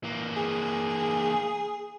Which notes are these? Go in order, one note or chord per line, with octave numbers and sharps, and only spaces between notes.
E3 A#3
G#4